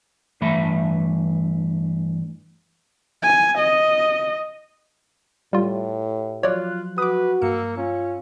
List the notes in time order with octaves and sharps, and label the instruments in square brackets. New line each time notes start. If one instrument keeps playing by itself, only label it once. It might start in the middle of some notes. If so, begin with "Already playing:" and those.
[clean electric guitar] G2 E3 A3 E5 B5
[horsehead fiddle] G#5
D#5
[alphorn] A2 [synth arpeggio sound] G3 F4 [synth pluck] G4
[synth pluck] F3 F#3 F#6 [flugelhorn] F4 [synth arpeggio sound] C#5 D5
[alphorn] F#4 [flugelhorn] B4 [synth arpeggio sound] D6 D#6
[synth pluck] G2 E6 C#7 [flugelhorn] A#3
[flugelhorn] C#4 [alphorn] F4